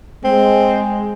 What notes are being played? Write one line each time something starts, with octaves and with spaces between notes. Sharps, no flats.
G#3 C4